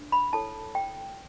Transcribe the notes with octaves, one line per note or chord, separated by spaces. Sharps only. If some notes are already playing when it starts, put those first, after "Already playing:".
Already playing: D4
B5
E4 A4 C#5 A5
G5